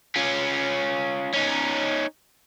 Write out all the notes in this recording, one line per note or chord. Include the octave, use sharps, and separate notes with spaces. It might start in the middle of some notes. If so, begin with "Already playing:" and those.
C#4 F4
C#4 D#4